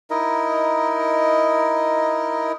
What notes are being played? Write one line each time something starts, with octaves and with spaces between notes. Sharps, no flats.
D#4 E4 A#4 D#5